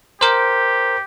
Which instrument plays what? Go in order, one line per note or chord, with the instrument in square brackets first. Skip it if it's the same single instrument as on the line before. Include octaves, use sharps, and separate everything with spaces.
[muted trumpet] G4 [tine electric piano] A#4 C5